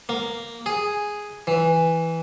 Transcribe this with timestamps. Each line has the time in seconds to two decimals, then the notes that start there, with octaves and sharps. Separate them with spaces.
0.09 A#3
0.66 G#4
1.47 E3